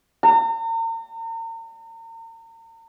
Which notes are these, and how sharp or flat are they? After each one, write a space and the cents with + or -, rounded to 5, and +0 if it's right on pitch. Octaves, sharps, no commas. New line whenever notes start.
A#5 -40